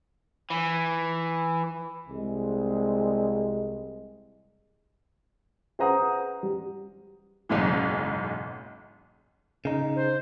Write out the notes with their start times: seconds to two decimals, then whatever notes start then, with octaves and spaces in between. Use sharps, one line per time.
0.50 E3
2.08 C2 G#3
5.79 G#4 B4 C5 F#5 A#5 D#6
6.43 G3
7.49 F#1 B1 G#2 E3
9.65 C#3 D#4
9.96 C5